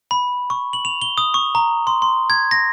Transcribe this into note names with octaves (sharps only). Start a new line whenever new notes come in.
B5
C#6
F#7
F7
G7
D#6
C#6
A#5
C6
C6
G#6
A#6